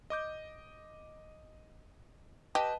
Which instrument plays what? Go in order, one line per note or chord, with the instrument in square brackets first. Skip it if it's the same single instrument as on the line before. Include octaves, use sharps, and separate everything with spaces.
[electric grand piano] D#5 D6 G6
[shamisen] G4 [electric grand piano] B4 D#5 G5 [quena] A5